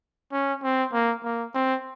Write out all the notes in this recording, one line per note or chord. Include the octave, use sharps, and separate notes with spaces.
C#4
C4
A#3
A#3
C4